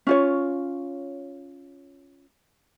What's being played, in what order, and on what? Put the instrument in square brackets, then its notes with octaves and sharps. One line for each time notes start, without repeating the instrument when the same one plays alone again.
[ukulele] C#4 F4 C#5